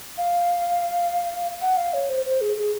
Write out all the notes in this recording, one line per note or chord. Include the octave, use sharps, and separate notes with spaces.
F5
F#5
F5
C#5
C5
C5
G#4
G#4